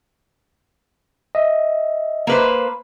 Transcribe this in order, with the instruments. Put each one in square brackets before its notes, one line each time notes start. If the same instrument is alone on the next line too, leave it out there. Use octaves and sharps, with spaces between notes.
[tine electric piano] D#5 E5
[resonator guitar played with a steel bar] A#3 B4 C5